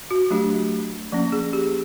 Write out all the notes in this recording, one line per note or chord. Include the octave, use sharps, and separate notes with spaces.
F#4
F#3 A3 D4 G4
F3 A#3 C#4
G#4
G4